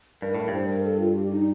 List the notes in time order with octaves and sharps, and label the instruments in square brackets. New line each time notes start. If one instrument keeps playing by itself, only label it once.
[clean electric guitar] G2 [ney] A#4
[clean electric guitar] A2 [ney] A#4
[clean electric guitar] G2
[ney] C5
A#4
A4
F4
G4
D#4